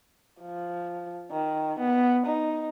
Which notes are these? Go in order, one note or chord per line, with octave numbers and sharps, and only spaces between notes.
F3
D#3
B3
D#4